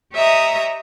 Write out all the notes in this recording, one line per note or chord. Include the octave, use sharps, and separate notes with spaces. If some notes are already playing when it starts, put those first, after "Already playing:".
G4 C#5 D#5 E5 A#5 D#6